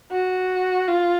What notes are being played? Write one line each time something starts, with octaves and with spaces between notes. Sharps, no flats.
F#4
F4